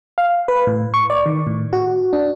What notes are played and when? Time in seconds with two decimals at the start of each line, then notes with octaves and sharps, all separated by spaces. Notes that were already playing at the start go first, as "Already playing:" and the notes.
0.18 F5
0.48 B4
0.67 A2
0.94 C#6
1.10 D5
1.26 D#3
1.47 A2
1.73 F#4
2.13 D4